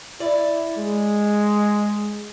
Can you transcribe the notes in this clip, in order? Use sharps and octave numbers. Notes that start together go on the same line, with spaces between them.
E4 D5
G#3